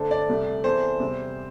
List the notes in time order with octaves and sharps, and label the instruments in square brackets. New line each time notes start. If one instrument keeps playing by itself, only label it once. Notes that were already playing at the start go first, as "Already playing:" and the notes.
Already playing: [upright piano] D3 A3 D4 A4 C5
[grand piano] D5
[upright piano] C2 C3 A3
[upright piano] E2 E3 C4 A4 D5 [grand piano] C5
[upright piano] E2 C3 G3